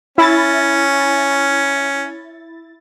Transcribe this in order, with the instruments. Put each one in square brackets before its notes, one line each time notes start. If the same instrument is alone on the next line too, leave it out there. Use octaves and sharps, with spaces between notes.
[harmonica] C#4 [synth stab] E4 A6